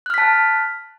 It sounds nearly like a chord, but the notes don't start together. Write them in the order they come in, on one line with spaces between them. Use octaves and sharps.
F#6 F6 B6 A5